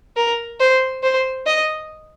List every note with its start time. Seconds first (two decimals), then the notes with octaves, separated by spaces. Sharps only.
0.16 A#4
0.60 C5
1.03 C5
1.47 D#5